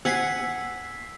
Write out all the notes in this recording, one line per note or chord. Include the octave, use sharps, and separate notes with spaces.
F#5 G#5 E6 B6 C7